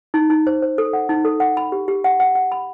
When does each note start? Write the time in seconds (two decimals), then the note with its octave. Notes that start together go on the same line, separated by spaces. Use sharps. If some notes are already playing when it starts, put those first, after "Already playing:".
0.14 D#4
0.30 D#4
0.47 C5
0.62 C5
0.78 A4
0.93 F#5
1.09 D#4
1.25 A4
1.40 F#5
1.57 B5
1.72 G4
1.88 G4
2.04 F#5
2.20 F#5
2.35 F#5
2.52 B5